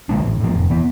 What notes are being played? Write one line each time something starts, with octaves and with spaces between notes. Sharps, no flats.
D3 G#3 D4
A1
A2 F3
F1
E3 B3